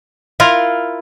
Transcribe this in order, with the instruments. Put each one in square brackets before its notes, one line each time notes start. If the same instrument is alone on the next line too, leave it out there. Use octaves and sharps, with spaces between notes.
[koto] E4 F4 A#4